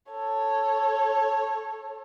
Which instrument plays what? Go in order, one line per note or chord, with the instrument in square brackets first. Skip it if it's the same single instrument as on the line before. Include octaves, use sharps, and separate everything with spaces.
[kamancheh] A4 C#5